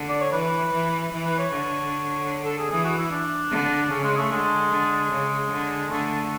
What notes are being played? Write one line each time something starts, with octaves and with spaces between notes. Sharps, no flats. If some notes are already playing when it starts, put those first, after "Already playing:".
Already playing: D3
D5
C#5
E3 B4
E3
E3
B4
C#5
D3
A4
G#4
E3 G#4
F#4
E4
D4
D3
C#3 C#4
G#3
A3
D3 G#3
D3
C#3
D3
D3 A3